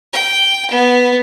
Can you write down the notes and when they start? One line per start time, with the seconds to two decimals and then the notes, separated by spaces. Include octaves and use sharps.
0.13 G5
0.71 B3